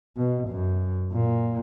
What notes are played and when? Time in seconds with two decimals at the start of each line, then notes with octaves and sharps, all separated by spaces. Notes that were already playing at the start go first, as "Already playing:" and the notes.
0.17 B2
0.49 F#2
1.13 A#2